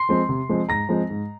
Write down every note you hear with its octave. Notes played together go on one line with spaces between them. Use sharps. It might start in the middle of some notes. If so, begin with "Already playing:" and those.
Already playing: C6 C7
F3 G#3 C4
C3
F3 G#3 C4
G#2 A#5 A#6
F3 G#3 C4
G#2